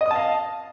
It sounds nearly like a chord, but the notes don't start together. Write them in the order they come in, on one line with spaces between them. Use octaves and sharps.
D#5 D#6 A5 F5